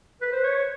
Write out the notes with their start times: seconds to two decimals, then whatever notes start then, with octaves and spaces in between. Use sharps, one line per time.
0.21 B4
0.32 C5
0.44 C#5